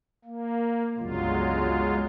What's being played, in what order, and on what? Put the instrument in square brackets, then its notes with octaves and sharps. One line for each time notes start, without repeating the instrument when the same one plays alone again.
[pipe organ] A#3
[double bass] G1 C#2 [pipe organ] F#3 G#3 F4